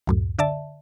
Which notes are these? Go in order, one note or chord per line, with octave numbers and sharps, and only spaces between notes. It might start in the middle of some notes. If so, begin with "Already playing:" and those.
C#2 F#2 A2
D3 D5 E5 A5